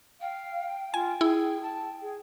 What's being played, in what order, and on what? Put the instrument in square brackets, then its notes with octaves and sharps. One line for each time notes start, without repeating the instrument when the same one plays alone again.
[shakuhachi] F5 [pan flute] G5
[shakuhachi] F4 [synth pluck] G#5
[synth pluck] E4 [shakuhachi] G#4
[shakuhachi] A5
G#4